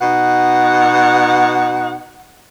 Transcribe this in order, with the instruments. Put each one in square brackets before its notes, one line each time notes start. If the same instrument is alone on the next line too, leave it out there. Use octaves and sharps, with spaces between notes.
[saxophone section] B2 D#4 F#5